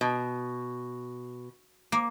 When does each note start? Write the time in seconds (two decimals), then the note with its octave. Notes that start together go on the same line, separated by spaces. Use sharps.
0.01 B2
1.92 A#3